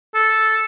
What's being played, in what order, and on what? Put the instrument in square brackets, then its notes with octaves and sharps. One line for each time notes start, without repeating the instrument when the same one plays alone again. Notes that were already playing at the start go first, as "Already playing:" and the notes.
[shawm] A4